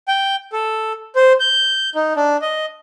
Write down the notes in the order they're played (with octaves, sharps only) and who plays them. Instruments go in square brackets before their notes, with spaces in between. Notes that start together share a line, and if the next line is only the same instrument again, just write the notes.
[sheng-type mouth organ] G5
A4
C5
G6
D#4
D4
D#5